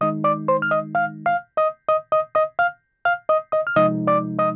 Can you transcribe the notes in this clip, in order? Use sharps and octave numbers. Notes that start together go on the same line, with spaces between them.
D#3 G#3 D#4 D#5 D#6
D5 D6
C5 C6
F6
D#5 D#6
F5 F6
F5 F6
D#5 D#6
D#5 D#6
D#5 D#6
D#5 D#6
F5 F6
F5 F6
D#5 D#6
D#5 D#6
F6
C3 F3 G#3 D#4 D#5 D#6
D5 D6
D#5 D#6